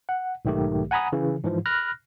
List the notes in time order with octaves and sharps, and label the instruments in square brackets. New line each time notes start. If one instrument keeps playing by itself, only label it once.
[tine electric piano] F#5
B1 G#2 D#3 A3 G4
F#5 G#5 A#5 B5 D#6
C#3 E3
G#2 E3 F3
B5 F6 F#6 A#6